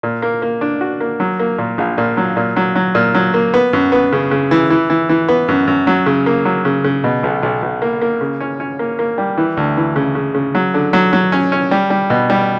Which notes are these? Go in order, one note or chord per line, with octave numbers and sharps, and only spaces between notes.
A#2
A#3
A#3
D4
F#4
A#3
F#3
A#3
A#2
A#1
A#2
F#3
A#2
F#3
F#3
A#2
F#3
A#3
B3
F#2
B3
C#3
C#3
E3
E3
E3
E3
B3
F#2
F#2
F#3
C#3
A#3
F#3
C#3
C#3
B2
B1
B1
B1
A#3
A#3
C#3
C#4
C#4
A#3
A#3
G3
E3
D2
E3
C#3
C#3
C#3
F#3
D3
F#3
F#3
C#4
C#4
G3
G3
B2
G3